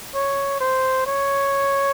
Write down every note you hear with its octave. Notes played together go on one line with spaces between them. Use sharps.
C#5
C5
C#5